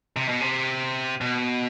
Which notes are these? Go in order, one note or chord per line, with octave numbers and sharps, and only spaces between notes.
C3
B2
C3
B2